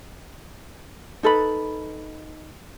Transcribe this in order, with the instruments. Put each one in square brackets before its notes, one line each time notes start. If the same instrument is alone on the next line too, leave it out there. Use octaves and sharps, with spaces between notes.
[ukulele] D#4 A4 B4 B5